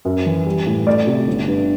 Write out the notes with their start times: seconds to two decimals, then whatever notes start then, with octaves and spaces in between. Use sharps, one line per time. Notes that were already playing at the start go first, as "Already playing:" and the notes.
0.05 F#2
0.26 E3
0.46 G3
0.67 A2
0.87 A3 D5
1.07 C3
1.27 G1
1.48 G2